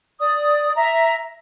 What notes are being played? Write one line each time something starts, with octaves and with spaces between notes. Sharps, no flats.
D5 D#6
E5 A#5